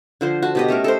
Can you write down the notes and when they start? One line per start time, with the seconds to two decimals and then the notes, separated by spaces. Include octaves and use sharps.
0.21 D3 F3 C5
0.42 F#4 A5
0.55 B2 G4 D#5
0.68 A3 C#4 A4 A#4
0.84 A4 A#4 C5